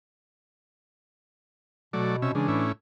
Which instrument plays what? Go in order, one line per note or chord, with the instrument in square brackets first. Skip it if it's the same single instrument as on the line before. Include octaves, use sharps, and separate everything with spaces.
[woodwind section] B2 [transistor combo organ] F#3 A3 D5
[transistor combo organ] C3 C#4 E5
[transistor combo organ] C#3 G#3 [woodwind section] E3 D4
[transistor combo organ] A2 C#4 E4